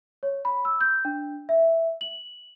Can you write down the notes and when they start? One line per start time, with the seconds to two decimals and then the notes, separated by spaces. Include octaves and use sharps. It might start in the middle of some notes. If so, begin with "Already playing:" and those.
0.23 C#5
0.45 B5
0.65 E6
0.81 G6
1.05 D4
1.49 E5
2.01 F#7